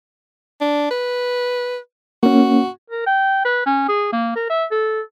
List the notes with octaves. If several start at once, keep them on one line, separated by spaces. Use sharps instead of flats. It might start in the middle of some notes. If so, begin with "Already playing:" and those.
D4
B4
A#3 C#4 F#4
A#4
G5
B4
C#4
G#4
A#3
A#4
E5
A4